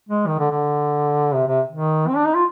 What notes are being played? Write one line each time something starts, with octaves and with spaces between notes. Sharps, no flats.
G#3
D#3
D3
D3
C3
C3
D#3
C4
D4
D#4
F4